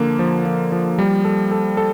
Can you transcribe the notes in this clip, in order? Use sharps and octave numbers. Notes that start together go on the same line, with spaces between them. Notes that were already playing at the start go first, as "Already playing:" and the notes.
Already playing: D3 F3 A#3
F3
F3
F3
G3
A4
A4
A4